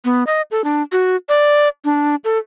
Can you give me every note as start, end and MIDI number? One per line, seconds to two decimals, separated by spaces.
0.05 0.24 59
0.27 0.42 75
0.51 0.64 69
0.64 0.82 62
0.92 1.16 66
1.29 1.68 74
1.85 2.15 62
2.24 2.38 69